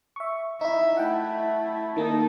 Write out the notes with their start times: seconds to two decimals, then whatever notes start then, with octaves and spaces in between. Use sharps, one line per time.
0.16 E5 C#6
0.61 D#4 E4 E5
0.97 A3 E4 F#5 G5
1.96 D#3 A#3 D#4 A4